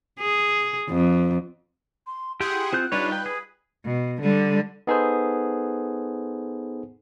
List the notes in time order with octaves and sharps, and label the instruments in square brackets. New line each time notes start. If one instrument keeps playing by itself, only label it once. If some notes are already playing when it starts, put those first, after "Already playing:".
[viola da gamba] G#4
F2
[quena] C6
[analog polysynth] E4 G#4 F#5 [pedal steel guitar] G4 G5 [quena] C6
[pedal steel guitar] C4 F4 G6 [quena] F#6
[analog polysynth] G3 D#4 F4 [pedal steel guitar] D4 B4 C#5
[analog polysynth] B4 [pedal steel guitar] G5
[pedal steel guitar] G#4
[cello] B2
D3 G3
[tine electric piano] B3 D#4 G#4 A4 B4 C5